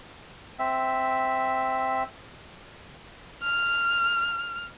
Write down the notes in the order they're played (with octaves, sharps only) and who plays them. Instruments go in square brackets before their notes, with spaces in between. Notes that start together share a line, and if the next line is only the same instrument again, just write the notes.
[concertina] C4 E5
[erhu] F6